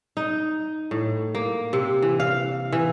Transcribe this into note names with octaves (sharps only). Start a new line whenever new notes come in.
D#4
A2
A#3
C3
E3
F5
E3